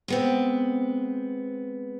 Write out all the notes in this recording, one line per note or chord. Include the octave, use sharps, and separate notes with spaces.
G#3 B3 C4